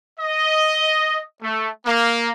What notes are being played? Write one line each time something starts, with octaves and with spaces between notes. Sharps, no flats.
D#5
A3
A#3